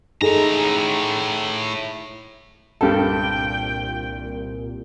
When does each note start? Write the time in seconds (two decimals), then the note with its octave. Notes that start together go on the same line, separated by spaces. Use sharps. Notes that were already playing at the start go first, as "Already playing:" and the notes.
0.22 A2 D#4 G#4 A4 A#5
2.81 C2 G2 A#2 G4 A4 A#4 G5 A5